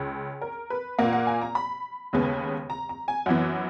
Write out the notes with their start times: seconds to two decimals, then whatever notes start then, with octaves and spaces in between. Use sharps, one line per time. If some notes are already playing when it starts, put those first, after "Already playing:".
Already playing: C#2 C#4
0.41 A#4
0.70 B4
0.99 A#2 A#3 F#5
1.13 F#5
1.27 G#5
1.41 A#5
1.55 B5
2.13 D#2 C#3 G#3 B3
2.70 A#5
2.89 A#5
3.08 G#5
3.26 F#2 E3 B3 F#5